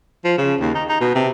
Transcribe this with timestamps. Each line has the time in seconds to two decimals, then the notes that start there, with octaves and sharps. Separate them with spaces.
0.25 F3
0.38 C#3
0.60 D#2
0.75 D#4
0.89 D#4
1.01 B2
1.15 C3